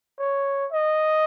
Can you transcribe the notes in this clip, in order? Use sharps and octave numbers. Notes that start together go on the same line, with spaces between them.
C#5
D#5